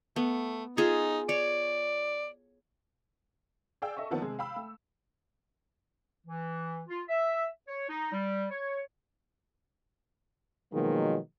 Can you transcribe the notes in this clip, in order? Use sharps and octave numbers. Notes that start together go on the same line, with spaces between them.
A3 B3
D#4 F4 G#4 A4
C#5 D5
G#4 D5 F5 G5 E6
A4 D#5 E5 C#6
D3 D#3 F3 A#3 B3 D4
C3 G#3 G#4
F5 G5 B5 E6
A3
E3
F4
E5
C#5
D#4
G3
C#5
B2 D#3 F3 F#3 G#3 A#3